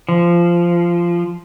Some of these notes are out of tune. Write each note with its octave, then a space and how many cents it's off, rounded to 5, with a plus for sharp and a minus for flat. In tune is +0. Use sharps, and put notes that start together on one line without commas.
F3 -15